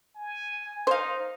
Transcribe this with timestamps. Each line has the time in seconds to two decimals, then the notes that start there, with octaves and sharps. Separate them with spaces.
0.16 G#5
0.87 D#4 C5 F5